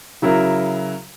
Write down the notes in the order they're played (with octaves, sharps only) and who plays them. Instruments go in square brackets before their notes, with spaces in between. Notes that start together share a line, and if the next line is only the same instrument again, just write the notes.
[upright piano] C#3 F#3 E4 A#4